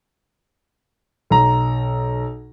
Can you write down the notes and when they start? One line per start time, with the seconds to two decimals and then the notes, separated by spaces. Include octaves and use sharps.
1.30 B1 A#5